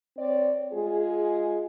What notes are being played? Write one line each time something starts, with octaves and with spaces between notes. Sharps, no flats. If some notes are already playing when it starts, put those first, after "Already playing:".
C4 C#5 D5
G#3 F4 G#4